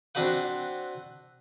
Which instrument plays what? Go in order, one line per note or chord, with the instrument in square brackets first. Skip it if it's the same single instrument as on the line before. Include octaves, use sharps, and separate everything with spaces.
[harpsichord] C4 D4 F#4 B4 F#5